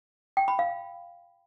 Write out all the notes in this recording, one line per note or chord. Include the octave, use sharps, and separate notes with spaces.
G5
B5
F5